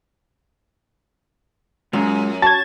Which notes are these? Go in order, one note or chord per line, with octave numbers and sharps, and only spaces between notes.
F#2 G#3 F4 F#5
F#4 A5 G#6 A6